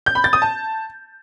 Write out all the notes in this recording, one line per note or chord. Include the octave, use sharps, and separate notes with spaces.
G6
B5
A6
D#6
A5